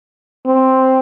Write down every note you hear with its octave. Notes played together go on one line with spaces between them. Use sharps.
C4